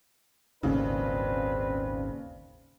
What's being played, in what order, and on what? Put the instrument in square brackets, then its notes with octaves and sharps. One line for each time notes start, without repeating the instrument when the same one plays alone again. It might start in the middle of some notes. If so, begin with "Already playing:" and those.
[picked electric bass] D#1 G#1 D#2 [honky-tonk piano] C#3 [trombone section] C4 D4 B4